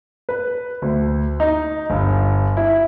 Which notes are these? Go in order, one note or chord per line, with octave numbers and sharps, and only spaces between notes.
B4
D2
D#4
G1
E4